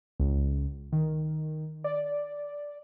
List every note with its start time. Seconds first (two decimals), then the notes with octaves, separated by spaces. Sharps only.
0.20 C#2
0.92 D#3
1.84 D5